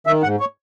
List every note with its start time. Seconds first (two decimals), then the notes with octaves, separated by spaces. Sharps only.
0.07 D#3 E5
0.23 G#2 F#5
0.40 C#5